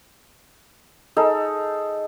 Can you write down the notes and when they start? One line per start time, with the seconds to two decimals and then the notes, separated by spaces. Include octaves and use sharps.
1.17 D#4 G#4 A4